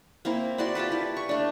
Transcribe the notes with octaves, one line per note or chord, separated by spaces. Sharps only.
A#3 C4 E4
E4 F#4 D5 C6
F4 G4 A4 B4
E4
C#6
A3 D4